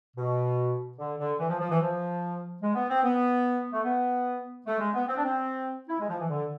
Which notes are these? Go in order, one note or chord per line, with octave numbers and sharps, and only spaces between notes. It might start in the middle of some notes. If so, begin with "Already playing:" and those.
B2
D3
D3
E3
F3
F3
E3
F3
G#3
B3
C4
B3
A3
B3
A3
G#3
B3
C4
D4
C4
E4
G#3
F3
E3
D3